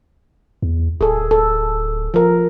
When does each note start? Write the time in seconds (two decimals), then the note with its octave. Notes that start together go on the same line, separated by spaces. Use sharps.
0.62 E2
1.01 D1 G#4 A4
1.31 A4
2.14 F3 A#4